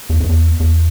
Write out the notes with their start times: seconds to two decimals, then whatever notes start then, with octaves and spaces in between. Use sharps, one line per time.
0.10 E2
0.20 F2
0.29 E2
0.60 E2